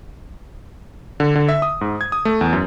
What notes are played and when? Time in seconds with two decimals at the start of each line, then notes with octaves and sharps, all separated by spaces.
1.20 D3
1.35 D3
1.49 E5
1.62 D#6
1.81 G#2
2.01 G#6
2.12 D#6
2.25 A3
2.41 E2
2.53 F#2